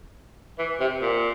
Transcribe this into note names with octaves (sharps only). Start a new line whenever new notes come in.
E3
C3
A#2